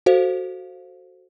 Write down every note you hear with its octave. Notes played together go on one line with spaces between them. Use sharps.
F#4 A4 C5 F5